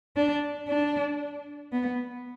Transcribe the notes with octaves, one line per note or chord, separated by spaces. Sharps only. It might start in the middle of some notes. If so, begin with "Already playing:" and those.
D4
D4
B3